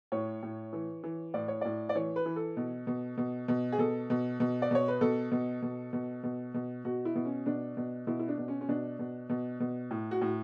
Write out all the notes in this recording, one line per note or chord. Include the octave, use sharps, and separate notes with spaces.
A2 C#5
A2
E3
E3
A2 D5
C#5
A2 D5
D5
E3 C#5
B4
E3
A4
B2
B2
B2
B2
G#4
B2 A4
B2
B2
D5
B2 C#5
B4
B2 A4
B2
B2
B2
B2
B2
B2 F#4
E4
B2
C#4
B2 D4
B2
B2 E4
E4
D4
B2
C#4
C#4
B2 D4
B2
B2
B2
A2
F#4
A2